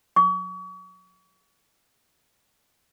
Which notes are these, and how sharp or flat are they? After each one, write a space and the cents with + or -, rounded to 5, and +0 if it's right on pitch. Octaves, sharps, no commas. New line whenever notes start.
C#6 +40